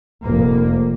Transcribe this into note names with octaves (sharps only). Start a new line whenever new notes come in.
F1 A#3